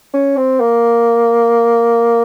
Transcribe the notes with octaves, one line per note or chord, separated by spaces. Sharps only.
C#4
C4
A#3